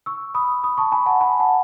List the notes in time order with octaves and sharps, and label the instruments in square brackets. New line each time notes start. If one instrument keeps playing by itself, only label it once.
[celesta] C#6 E6
B5 D#6
B5 D#6
A5 C#6
G#5 B5
F#5 A5
G#5 B5
F#5 A5